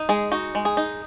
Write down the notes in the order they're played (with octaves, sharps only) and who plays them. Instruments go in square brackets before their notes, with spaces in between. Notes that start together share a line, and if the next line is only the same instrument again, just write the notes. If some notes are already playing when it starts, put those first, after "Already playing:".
Already playing: [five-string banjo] D#4
G#3 G#4
D#4 F#4
G#3
G#4
D#4